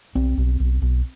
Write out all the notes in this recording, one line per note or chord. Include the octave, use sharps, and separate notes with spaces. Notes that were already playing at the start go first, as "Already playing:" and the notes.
B1 C4
B1
B1
B1